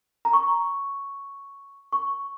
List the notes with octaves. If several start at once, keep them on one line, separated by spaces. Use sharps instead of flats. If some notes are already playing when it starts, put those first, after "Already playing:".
A#5
C#6
C#6